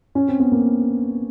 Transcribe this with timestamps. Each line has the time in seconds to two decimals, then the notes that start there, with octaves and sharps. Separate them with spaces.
0.15 C#4
0.28 C4
0.40 B3
0.52 A#3